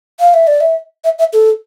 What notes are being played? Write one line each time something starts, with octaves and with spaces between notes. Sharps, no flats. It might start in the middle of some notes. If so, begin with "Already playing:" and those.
F5
E5
D5
E5
E5
E5
A4